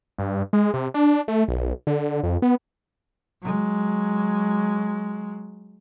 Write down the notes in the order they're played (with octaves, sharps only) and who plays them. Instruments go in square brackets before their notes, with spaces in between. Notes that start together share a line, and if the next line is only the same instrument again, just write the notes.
[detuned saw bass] G2
G#3
C3
D4
A3
B1
D3
F2
B3
[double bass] F#3 G#3